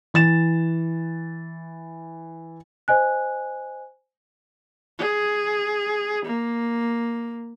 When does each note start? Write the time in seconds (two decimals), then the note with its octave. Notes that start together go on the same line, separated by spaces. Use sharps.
0.14 E3 A6 E7
2.88 C5 D#5 G#5 F#6
4.99 G#4
6.25 A#3